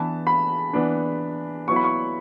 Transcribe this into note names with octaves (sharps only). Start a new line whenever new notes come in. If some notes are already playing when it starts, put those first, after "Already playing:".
Already playing: E3 B3 D4 A5
B5
E3 B3 D4
F#3 B3 E4 C#6
B5
C#6